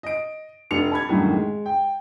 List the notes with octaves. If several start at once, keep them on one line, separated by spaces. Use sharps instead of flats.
D#5 D7
F1 D4 C#7 F7
A5 B5 G#6
C2 F#2 A2 D3 D#3
G#3
G5